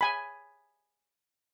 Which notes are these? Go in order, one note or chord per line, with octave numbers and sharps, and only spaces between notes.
G#5 B5